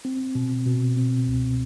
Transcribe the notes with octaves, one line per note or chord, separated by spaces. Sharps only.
C4
B2
B2
C4
C#2